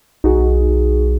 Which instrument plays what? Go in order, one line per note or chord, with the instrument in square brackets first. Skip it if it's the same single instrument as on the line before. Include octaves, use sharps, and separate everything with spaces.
[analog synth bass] B1 [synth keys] D#4 F#4 G#4